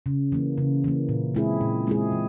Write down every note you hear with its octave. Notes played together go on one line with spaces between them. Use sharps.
C#3
E3 A#3
C#3
E3 A#3
A#2
G#3 C4 E4 G#4
A#2
G#3 C4 E4 G#4
E3